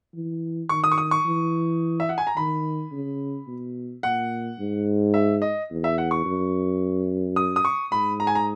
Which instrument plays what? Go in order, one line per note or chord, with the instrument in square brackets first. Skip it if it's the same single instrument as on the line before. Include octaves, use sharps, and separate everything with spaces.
[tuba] E3
[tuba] D#3 [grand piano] C#6
[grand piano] D#6
C#6
D#6
C#6
[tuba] E3
[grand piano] E5
F#5
G#5
A#5
[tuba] D#3 [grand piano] B5
[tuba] C#3
B2
[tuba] A#2 [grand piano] F#5
[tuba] G#2
[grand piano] E5
D#5
[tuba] E2
[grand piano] E5
F#5
C#6
[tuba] F#2
[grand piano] D#6
D#6
C#6
[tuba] G#2 [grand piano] B5
[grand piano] A#5
G#5
A#5